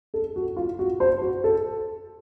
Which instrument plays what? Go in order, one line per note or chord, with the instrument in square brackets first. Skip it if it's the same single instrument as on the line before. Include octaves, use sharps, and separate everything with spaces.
[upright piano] A4
F#4
F4
F#4
C5
F#4
A4